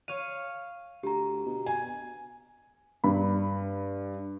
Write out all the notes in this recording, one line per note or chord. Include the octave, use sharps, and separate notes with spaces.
C#5 F5 D#7
D2 G4 A#5
B2
G#5
G2 B5